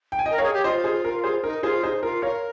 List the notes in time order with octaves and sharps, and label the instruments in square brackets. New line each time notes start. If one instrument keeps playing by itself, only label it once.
[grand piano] G5
G#5
D#5 G5
[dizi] A#4
[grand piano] C#5 F5
[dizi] G#4
G4
[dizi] F4 [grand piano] C5 D#5
[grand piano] G#4 C5
A#4
G#4 C5
[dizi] D#4 [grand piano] A#4
[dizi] F4 [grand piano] G#4 C5
[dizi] D#4 [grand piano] G#4 C5
[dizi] F4 [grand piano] A#4
[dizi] A#4 [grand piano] C#5 F5